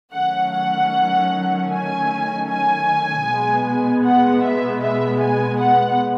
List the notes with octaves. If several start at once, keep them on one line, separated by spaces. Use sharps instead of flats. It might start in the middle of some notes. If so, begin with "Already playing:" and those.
D#3 F#3 A3 C#4 F#5
F#5
G#5
G#5
B2 G#3 B3
F#5
E5
E5
G#5
F#5